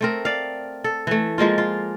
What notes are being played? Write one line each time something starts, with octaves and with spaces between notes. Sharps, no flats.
A3 C4 A#4
D5 F5
A4
E3 A3
F3 G#3 A#3 F4
F4